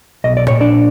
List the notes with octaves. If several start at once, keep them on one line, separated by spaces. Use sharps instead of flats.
B1 D#5
D5
A#2 C#5
D4 D5